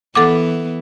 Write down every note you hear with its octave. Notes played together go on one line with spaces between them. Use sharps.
E3 B3 A4 F#5 D6